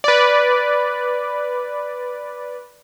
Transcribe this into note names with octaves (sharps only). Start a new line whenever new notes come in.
B4 D5